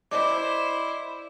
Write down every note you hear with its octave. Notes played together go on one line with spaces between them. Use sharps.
E4 C5 D5 D#5 D6